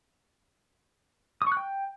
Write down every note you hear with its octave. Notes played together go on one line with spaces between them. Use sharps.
D#6
C#6
F#6
G5